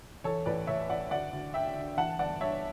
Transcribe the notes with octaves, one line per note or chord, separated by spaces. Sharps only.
E3 A4 C#5
A1 B4 D5
A2 C#5 E5
A1 D5 F#5
D2 D5 F#5
D2
D3 E5 G5
D3
E3 F#5 A5
G1 D5 F#5
G2 C#5 E5